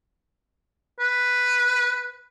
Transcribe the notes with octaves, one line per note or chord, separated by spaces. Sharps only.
B4